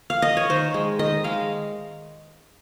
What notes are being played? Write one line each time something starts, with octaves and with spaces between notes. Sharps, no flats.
F5
D#5
C#5
D#3 C5
G#3
D#3 D#5
G#3 F5